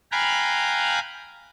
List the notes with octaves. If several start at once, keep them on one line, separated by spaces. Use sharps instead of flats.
F5 G5 G#5 A#5 B5 F#6